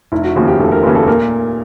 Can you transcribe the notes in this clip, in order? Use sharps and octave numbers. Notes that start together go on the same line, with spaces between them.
F1 E4
F#4
D#2 C#3 F3 F#4
G4
F1 A4
A#4
D#2 C#3 F3 B4
A4
A#2 A#4